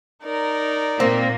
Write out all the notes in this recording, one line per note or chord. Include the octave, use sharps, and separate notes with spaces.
D#4 A#4 D5
A#2 A#3 C4